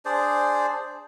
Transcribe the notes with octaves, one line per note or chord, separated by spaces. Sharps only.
D4 G#4 C5 D5